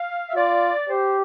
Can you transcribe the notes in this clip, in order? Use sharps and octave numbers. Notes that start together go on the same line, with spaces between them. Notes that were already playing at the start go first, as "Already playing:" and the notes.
Already playing: F5
E5
F4 D5
G4 C5